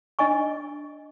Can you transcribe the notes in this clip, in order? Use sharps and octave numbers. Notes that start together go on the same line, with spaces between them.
D4 D#5 G#5 C#6